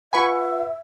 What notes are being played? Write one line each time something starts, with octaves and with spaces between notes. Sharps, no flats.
F4 B4 E5 F#5 G#5 B5 C#6